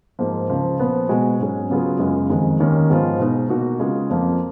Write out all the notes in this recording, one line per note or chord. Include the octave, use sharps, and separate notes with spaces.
G#2 F3 A#3
C#2 C#3 F3
A#2 F3 B3
B2 G#3 B3 F#4
G#2 F#3 C#4 G#4
C#3 F#3 B3 F4 G#4
F#2 C#3 G#3 B3 F4
F2 D#3 G#3
D#2 D#3 A#3 C#4
G#2 F3 G#3 B3 F4
B2 G#3 D#4
B2 A#3 D#4 F#4
C#3 G#3 B3 F4 G#4
F2 F3 A#3